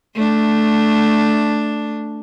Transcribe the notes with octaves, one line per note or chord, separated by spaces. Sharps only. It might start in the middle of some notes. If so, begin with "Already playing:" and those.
A3 D4